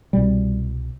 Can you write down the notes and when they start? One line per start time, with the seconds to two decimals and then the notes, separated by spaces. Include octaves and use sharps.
0.13 C2 B2 G3